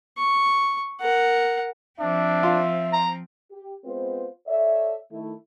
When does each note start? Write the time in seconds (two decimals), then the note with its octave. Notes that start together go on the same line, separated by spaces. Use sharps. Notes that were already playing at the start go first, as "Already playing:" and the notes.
0.18 C#6
1.01 A#4 F#5
2.00 F3 C4 D4 E5
2.43 F4
2.93 A#5
3.52 G4
3.84 G#3 B3 C4 F4 B4 C5
4.48 A4 C#5 D5 E5
5.12 D#3 A3 E4